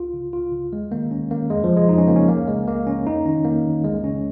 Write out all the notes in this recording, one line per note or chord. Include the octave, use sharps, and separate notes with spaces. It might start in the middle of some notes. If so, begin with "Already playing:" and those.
Already playing: C#2 F4
C#3
C#2 F4
C#3
D#2 G#3
D#3 A#3
D#2 C#4
D#3 A#3
F2 G#3
F3
C#3
G#3
F2 D#4
C#4
C#3 A#3
C#4
C#2 A#3
C#3 G#3
C#2 A#3
C#3 C#4
F2 D#4
D#3 C#4
F2 A#3
D#3
C#2 G#3
C#3 C#4